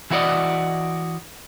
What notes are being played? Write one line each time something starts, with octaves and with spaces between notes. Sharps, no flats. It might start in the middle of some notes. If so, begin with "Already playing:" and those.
E3 E4 F#4 C5 D5 D#5